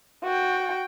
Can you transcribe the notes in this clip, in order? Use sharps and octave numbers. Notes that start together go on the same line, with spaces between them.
F#4 G5